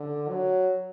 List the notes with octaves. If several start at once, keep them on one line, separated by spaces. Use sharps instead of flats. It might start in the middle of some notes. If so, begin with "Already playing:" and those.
Already playing: D3
F#3